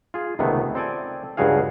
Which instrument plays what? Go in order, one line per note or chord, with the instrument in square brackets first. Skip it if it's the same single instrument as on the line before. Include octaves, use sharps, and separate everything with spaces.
[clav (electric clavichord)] F4 G#4
C#2 C3 D#3 A3 B3
C4 A4 D5 G#5
C#2 G2 C#3 F#4 G#4 F5